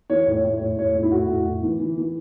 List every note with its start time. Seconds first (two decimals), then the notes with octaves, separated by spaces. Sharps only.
0.10 E3 C#5
0.27 A2
0.34 C#5
0.45 A2
0.57 C#5
0.61 A2
0.77 A2 C#5
0.95 A2
1.03 E4
1.12 A2 F#4
1.29 A2
1.47 A2
1.62 E3
1.80 E3
1.98 E3